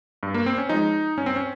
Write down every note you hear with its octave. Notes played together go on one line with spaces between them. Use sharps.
G2
A#3
C4
C#4
F3 G#3 D#4
G2 C#4
C4
C#4